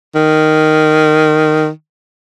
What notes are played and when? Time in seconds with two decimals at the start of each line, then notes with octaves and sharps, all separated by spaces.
0.15 D#3